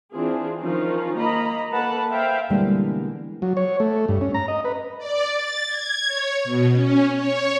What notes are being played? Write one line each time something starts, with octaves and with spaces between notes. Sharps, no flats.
E3 C4 D4 F4 G#4
D#3 F3 C#4 D#4 F4
A#3 D#5 A#5 B5
A#3 A4 B4 F#5 A5 B5
C5 E5 F5 G5
B2 D3 E3 G3 G#3 A#3
F#3
C#5
A3
G2
C#4
A#5
D#5
B4
D5
A6
G#6
C#5
B2
C#4
C#5